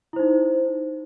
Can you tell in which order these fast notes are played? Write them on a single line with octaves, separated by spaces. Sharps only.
E4 C5 D#4